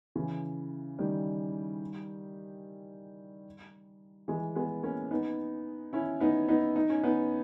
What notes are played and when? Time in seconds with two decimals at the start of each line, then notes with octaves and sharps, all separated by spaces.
0.15 C#3 E3
0.98 D#3 G3
4.28 E3 G#3
4.55 G#3 B3
4.83 A#3 C#4
5.11 B3 D#4
5.93 C#4 E4
6.20 B3 D#4
6.48 B3 D#4
6.76 D#4
6.90 C#4
7.03 B3 D#4